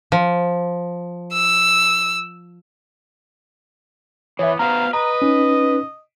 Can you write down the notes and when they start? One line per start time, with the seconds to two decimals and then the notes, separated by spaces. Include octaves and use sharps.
0.12 F3
1.33 E6
4.39 E3 B3 C#5 E5
4.59 B3 F#4 C5 F5 A#5
4.93 B4 D#5 A#5
5.22 C#4 D#4